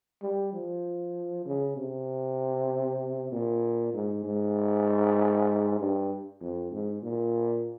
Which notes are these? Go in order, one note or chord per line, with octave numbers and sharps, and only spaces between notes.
G3
F3
C#3
C3
A#2
G#2
G#2
G2
F2
G#2
A#2